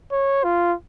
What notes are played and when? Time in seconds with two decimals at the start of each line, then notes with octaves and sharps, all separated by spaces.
0.12 C#5
0.44 F4